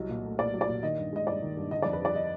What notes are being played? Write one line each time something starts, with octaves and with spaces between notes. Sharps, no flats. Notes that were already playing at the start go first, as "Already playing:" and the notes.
Already playing: C2 F#3 D#5
A#2
A3
A#2 D5
F#3
D5
A#2
D#3 D#5
G2
G#3 D#5
G2 D5
D#3
G2
D3 D#5
F2 D5
B4
G3 D5
D#5